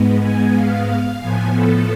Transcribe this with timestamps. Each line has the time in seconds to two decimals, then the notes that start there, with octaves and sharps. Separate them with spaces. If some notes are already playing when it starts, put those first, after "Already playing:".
Already playing: G#2 G#3 B3
0.20 G#5
0.53 F5
1.19 A2 F3 B3 G#5
1.54 A4